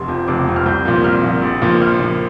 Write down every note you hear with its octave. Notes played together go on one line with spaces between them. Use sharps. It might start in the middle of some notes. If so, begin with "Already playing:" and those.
Already playing: F1 C6
F2 F3
F1 D6
F2 F3
F6
C2 G6
A#2 F3
C2 F6
A#2 F3
A#1
A#2 F3
A#1 F6
A#2 F3